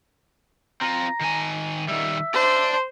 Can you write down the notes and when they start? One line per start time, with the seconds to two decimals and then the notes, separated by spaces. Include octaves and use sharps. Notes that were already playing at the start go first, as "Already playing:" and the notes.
0.81 C4 F4 A#5
1.21 D#3 G#5
1.88 D#3 G3 E5
2.34 C5 D5 A5